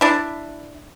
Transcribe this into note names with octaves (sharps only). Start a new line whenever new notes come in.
D4 E4